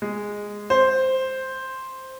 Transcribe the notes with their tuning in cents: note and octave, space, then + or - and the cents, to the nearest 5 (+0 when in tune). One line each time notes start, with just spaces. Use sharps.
G#3 -10
C5 +0